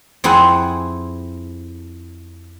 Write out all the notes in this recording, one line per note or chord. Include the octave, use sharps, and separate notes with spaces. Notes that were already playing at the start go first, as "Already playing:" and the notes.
F2 C4 E4 G#4 F#5 G#5